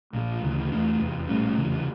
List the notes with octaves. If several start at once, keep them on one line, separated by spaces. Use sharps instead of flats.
A#1 A#2 F3
D2 C#3 E3
E2 E3 A3 D4
F1 E2 E3
A#1 A2 G3 C#4
F1 E2 C#3 E3